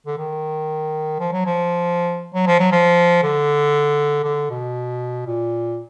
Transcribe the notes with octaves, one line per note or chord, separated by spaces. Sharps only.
D3
D#3
F3
F#3
F3
F#3
F3
F#3
F3
D3
D3
B2
A#2